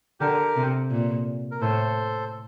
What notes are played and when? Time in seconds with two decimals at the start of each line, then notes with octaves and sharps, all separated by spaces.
0.20 D3 G4 A#4
0.56 C3
0.91 A#2
1.51 A#4
1.61 A2 A4 C5